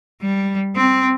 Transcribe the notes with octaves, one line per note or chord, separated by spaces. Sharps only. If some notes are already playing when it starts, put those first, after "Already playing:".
G3
C4